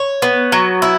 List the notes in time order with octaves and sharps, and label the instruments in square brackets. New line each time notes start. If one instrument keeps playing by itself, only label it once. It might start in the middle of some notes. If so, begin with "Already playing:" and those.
Already playing: [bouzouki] C#5
B3
F#3
E4